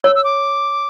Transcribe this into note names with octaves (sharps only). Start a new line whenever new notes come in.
C#5 E6
E6
D6